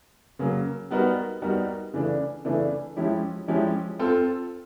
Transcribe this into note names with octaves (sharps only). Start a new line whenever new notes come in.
C#3 F#3 A#3
G3 B3 D#4 F#4 A#4
G3 B3 D#4 F#4 A#4
C#3 E3 A3 D4
C#3 E3 A3 D4
F3 G#3 C#4 E4 G4
F3 G#3 C#4 E4 G4
C4 F4 A4